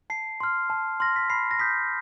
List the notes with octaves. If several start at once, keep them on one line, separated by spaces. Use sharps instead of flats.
A5 C7
C6 F6
A5
C6 F6 A#6
B6
B5 C7
A#6
D#6 G6 B6